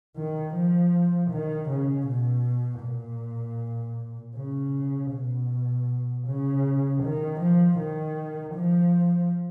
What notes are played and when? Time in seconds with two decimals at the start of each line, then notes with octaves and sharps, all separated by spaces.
0.17 D#3
0.55 F3
1.31 D#3
1.69 C#3
2.07 B2
2.83 A#2
4.37 C#3
5.13 B2
6.27 C#3
7.03 D#3
7.40 F3
7.79 D#3
8.55 F3